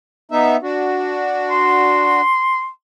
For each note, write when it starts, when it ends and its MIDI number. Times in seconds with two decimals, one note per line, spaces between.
0.31 0.56 59
0.31 0.56 63
0.31 0.56 76
0.62 2.21 62
0.62 2.21 66
1.51 2.69 84